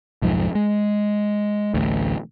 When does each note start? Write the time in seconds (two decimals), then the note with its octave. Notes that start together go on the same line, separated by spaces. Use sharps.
0.22 B1 F2 G#2 F3
0.55 G#3
1.74 A1 D2